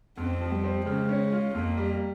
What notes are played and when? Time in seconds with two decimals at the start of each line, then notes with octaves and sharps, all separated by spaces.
0.17 F2 C4
0.41 F3
0.52 G3
0.63 C4
0.86 C#3 G#3
1.09 C#4
1.32 F4
1.55 F2 A#3
1.77 G3